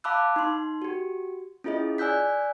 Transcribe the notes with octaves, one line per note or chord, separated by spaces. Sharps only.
F5 A5 B5 D6 E6 F#6
D#4 C6
F#4 G4
C#4 E4 F4 G#4 D#5
D5 G#5 E6 F#6 G6 B6